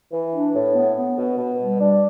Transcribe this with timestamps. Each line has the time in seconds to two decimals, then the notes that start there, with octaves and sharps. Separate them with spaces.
0.11 E3
0.33 D4
0.54 A2
0.74 B3
0.95 B3
1.16 B2
1.37 B2
1.58 G3
1.79 D4